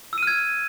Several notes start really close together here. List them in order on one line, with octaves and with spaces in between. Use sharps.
E6 D#7 F6 G#6